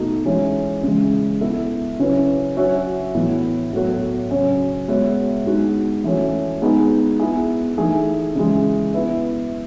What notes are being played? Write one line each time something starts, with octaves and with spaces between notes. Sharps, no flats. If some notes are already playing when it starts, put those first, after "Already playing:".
Already playing: B2 A3 D#4 F#4
E3 G#3 C#4
C#3 E3 G#3
B3 E4 A4 E5
C#3 F#3 C#4 E4 B4
F#3 C#4 F#4 C#5 E5
A2 E3 B3 E4
A2 F#3 B3 F#4 A4
C#3 F#3 C#4
G#3 B3 F#4 C#5 E5
G#3 B3 D#4 F#4
E3 A3 C#4 F#4
G#3 B3 D#4 G#4 B4
B3 E4 G#4
E3 A3 D#4 G#4
C#3 E3 G#3
B3 E4 B4 E5